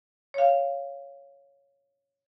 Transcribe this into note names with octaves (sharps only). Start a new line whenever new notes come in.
C#5 F5